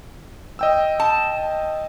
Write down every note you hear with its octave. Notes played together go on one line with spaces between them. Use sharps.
D#5 G5 E6
A5